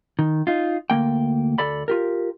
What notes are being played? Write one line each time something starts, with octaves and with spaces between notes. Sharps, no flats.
D#3
D#4 F4
D2 A3 A#3 G5
D2 A4 D5 B5
F4 G4 A#4